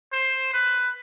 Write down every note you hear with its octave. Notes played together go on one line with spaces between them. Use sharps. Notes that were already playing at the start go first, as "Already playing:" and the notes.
C5
B4